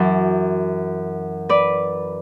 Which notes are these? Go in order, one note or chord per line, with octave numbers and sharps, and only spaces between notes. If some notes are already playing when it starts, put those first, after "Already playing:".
Already playing: F#2 E3
B4 D5